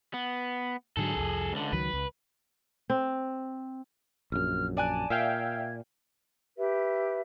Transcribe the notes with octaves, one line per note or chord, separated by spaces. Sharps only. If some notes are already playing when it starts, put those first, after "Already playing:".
B3
G#2 D3 F#3 G#4 A4
C2 F2
C#2 D3
C#2 D#3 F#3 B4
C#2
C4
A#1 F#2 F6
D5 G#5 A5 F#6
A#2 E5 F5 G5 G#6
G4 B4 E5